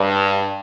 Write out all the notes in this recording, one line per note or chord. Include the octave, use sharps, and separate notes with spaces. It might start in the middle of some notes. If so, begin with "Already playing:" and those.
Already playing: G2